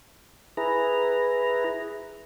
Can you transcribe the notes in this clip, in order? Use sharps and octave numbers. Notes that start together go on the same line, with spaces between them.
E4 G#4 B4 A#5